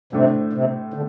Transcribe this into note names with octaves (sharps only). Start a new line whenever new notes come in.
A2 C3 A3 D4 C5
C3
D3